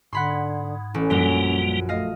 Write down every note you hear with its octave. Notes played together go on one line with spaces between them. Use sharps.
G#2 D3 F#5 B5 C6
A1 C#4
A#1 F#2 G3 A#3
A3 D#5 F5